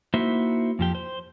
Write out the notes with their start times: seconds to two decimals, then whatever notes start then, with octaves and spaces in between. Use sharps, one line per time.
0.14 A#3 D#4 E4 F#4 C5 E5
0.79 F2 F3 G4
0.95 C5